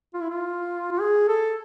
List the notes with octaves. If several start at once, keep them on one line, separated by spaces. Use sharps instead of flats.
F4
E4
F4
F4
G#4
A4